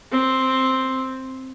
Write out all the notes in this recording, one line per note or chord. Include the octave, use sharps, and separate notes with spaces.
C4